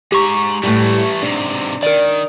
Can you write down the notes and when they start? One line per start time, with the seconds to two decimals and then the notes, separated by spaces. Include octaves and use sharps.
0.12 G#3 G4 A#5 C#6
0.63 A2 E3 G3 A3
1.22 G#2 C3 D4
1.83 D#3 A#4 D5